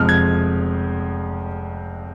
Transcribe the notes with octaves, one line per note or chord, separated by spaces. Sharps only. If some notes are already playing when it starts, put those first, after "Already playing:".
Already playing: F1 F2 F3 G#3 F6
G#6